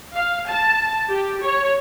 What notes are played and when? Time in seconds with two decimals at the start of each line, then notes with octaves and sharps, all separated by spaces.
0.16 F5
0.48 A5
1.10 G4
1.42 C#5